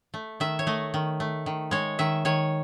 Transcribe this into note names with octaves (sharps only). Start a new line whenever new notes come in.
A3
D#3 E5
C#5
A3 D#5
D#3
A3
D#3
G#3 C#5
D#3 E5
D#3 C#5